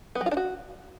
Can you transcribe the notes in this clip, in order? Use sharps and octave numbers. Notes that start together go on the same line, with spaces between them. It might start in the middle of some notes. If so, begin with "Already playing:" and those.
B3
F#3
F4
D4
F#4